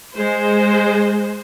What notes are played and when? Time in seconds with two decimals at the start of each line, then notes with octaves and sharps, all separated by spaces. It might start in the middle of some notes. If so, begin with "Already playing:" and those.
0.16 G#3 C5